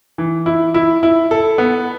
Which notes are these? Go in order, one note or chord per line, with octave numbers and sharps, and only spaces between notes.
E3
E4
E4
E4
A4
B3